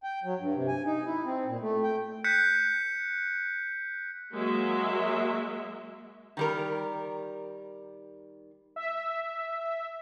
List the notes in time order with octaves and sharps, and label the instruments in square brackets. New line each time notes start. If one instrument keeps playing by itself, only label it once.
[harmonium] G5
F#3
G2
C3
G#5
D#4
E4
C4
A#2
A3
G5
[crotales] F#6 G6 B6 C#7
[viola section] F#3 G#3 A#3 F#4 E5
[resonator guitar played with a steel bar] D#3 G3 A#4
[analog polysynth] E5